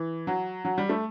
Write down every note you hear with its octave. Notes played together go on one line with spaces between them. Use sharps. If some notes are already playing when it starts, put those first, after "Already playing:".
Already playing: E3
F#3
F#3
G3
A3